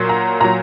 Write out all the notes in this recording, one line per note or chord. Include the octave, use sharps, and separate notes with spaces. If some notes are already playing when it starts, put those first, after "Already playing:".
Already playing: A#2 F#3
A#5
A#2 F#3 A#5